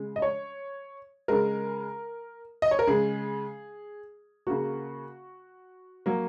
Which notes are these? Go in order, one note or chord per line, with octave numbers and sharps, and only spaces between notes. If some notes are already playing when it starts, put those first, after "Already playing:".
Already playing: C#3 G#3
D#5
C#5
C#3 G#3 A#4
D#5
C#5
A#4
C#3 G#3 G#4
C#3 A#3 F#4
F#3 A#3